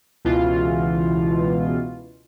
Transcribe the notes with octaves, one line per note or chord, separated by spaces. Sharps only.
C#2 B2 E3 F4